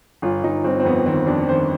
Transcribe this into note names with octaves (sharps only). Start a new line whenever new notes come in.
G1 F4
G1 D#4
G1 C4
C4
F2 B3
D#3 C4
F2 D4
D#3 C5